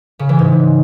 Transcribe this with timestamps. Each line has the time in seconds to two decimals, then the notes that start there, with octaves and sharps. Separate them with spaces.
0.19 C#3
0.29 E3
0.39 G#2